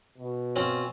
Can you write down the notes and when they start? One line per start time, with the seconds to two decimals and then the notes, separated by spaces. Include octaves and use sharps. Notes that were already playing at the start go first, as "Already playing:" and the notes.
0.18 B2
0.56 C4 C#4 F4